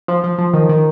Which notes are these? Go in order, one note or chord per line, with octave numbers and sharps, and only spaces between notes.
F3
F3
F3
D#3
D#3